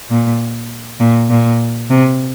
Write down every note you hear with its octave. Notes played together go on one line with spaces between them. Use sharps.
A#2
A#2
A#2
C3